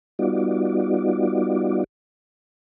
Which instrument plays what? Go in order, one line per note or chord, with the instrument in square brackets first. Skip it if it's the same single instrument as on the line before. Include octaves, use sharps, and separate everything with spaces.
[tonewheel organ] G3 B3 D#4 F4 F#4 D5